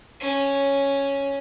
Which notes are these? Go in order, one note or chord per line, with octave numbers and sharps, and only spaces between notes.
C#4